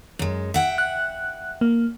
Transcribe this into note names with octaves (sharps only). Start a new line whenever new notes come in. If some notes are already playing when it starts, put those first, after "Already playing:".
F#2 G#3
E5 F#5 G5
F#6
A#3